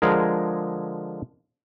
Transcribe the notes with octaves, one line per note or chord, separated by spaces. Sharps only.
D3 F3 G#3 G#4 A#4